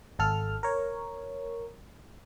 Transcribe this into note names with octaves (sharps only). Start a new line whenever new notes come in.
G#1 A4 F6
A#4 C#5